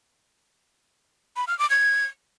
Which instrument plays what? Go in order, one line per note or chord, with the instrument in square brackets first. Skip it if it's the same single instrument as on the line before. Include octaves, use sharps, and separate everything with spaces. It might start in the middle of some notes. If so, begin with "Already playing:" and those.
[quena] B5
F6
D6
G#6